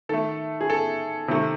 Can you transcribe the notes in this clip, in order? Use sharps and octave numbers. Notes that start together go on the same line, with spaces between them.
D#3 A3 A4
G#4
A4
C3 D#3 A3